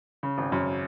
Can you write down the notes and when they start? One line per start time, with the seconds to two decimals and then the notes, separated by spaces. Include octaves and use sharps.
0.23 C#3
0.38 G#1
0.52 F#2